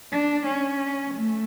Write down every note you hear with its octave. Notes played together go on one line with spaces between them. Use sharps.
D4
C#4
A3